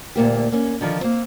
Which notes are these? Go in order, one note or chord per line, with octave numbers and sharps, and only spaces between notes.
D2 A#2 A#3 G4
A#3 C#4
D3 D#3 F3
A#3 C4